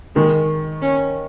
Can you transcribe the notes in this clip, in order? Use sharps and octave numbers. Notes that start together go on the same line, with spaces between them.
D#3 G#3
C#4